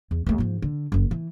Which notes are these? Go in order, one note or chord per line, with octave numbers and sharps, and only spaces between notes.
E2
D#2 A3
G#2 F3
D3
F#1 F#2
E3